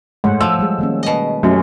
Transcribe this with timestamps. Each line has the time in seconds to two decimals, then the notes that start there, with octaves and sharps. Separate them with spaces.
0.24 G#2 A3 C#5 F#5
0.41 F3 E6
0.59 G3 G#3 G#4
0.78 D#3 A#3 C#4
1.03 B2 D#5
1.43 F#2 A3 C#4 G4